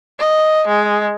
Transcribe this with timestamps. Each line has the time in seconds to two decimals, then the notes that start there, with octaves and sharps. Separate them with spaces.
0.19 D#5
0.68 G#3